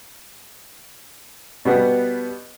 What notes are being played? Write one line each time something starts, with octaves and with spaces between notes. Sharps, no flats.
B2 G3 B3